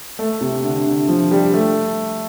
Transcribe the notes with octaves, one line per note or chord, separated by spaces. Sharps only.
A3
C3
D3
D3
F3
G3
A3